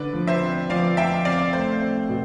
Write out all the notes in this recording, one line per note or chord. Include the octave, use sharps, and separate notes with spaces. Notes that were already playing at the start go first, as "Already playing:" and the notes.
Already playing: D3 B4 D5
F3
C5 E5
C4
F3 D5 F5
F3 E5 G5
C4 D5 F5
A3 C5
C4
B2